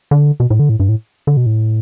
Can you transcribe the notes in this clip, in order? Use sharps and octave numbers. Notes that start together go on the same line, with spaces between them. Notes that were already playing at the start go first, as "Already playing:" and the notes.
D3
B2
A2
D3
A2
G2
A2
D3
B2
A2